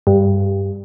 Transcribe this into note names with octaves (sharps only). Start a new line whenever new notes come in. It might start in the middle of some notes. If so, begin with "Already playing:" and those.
G2